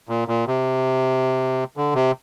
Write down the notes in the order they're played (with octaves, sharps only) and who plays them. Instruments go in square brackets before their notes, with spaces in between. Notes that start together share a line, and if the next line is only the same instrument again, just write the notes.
[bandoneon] A#2
A#2
C3
D3
C3